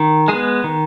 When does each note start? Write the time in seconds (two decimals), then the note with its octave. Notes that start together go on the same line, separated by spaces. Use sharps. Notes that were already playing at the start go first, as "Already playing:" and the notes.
Already playing: D#3
0.28 G#3 B3 G#4
0.64 D#3